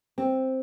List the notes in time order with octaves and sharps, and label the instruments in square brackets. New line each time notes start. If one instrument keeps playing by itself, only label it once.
[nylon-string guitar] C4